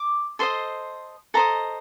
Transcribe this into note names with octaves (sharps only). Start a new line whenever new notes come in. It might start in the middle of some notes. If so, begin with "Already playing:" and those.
Already playing: D6
A4 C5 D#5 C6
A4 C5 D#5 A#5